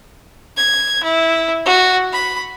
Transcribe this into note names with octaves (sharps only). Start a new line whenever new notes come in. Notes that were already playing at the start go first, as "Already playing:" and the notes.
G#6
E4
F#4
B5